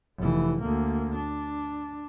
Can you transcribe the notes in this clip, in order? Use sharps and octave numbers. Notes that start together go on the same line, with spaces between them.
F1 E3
D2 A#3
D4